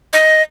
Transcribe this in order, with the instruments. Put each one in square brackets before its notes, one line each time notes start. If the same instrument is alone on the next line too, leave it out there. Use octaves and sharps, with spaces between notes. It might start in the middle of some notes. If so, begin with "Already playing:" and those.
[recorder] D#5